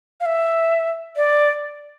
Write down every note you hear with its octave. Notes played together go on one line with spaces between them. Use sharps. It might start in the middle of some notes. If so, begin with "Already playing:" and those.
F5
E5
D5